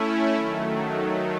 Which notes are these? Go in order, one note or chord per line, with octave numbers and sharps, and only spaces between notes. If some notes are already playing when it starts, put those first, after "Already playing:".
Already playing: A3 C#4 E4
D#3 F#3 A3